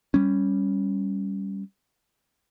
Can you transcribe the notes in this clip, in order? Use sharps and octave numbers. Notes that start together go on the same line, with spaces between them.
G3 C#4